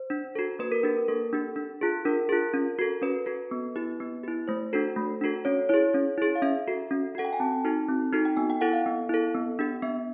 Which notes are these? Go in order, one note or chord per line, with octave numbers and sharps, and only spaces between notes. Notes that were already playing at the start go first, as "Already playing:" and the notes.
Already playing: C5
D4
F#4 A4
A#3 B4
A#4
D4 G4 B4
A#4
A#3 A4
D4 G4
D4
F4 G#4
D4 A#4
F4 G#4
C#4
F#4 A4
C#4 B4
F#4 A4
B3
E4 G4
B3
E4 G4
A3 C5
D4 F#4 A4
A3
D4 F#4 A4
C#4 C#5
E4 G#4 C#5
C#4
E4 G#4
F5
C#4 E5
F#4 A4
C#4
F#4 A4 F#5
G5
G#5
C4 A5
D#4 F#4 A4
C4
D#4 F#4 A4
G5
B3 G#5
G5
E4 A4 F#5
F5
B3
E4 A4
B3
D4 G4
B3 E5